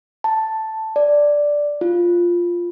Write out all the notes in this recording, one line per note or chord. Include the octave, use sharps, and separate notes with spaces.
A5
D5
F4